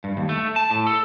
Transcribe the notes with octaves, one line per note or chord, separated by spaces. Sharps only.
G2
D#2
A3
A5
A2
A4